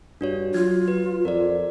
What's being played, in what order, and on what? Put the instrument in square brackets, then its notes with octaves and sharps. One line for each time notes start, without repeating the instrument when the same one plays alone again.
[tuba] G2 [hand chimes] D4 F#4 C#5
[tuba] F#3 [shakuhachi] F4 [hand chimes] G#6
[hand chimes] B4
[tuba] F2 [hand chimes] A#4 D5